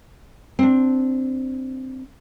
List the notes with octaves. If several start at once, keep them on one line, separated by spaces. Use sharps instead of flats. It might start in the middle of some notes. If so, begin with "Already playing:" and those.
C4 D4